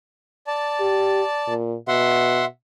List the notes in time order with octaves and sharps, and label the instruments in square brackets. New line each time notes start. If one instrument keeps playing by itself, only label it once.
[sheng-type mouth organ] D5 A5
[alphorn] G4
A#2
[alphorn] B2 [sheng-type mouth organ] E5 F#5 C6